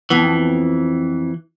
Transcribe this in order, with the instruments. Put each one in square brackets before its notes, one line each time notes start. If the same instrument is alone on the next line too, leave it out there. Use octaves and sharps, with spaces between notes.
[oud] F2 B3 [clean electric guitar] E3